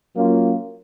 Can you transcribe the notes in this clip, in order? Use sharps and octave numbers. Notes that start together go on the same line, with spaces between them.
F#3 A#3 C#4 F4